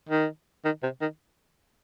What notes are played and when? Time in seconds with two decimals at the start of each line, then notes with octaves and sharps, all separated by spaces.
0.09 D#3
0.65 D#3
0.83 C3
1.01 D#3